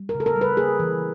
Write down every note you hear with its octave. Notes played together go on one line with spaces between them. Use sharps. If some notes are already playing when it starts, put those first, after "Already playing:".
Already playing: G3
A#4
C#3
A4
A#4
G3
B4
A#3 G#4
E3